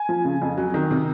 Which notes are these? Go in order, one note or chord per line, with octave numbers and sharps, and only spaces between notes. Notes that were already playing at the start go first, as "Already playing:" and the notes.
Already playing: G#5
F3
C#3
F2
F#3
D#3
C3